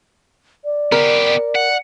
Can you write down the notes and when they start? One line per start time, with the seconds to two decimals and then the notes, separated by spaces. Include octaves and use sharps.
0.65 D5
0.92 B3 G4 A#4
1.55 F#5